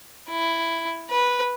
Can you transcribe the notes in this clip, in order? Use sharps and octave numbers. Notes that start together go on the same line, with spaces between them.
E4
B4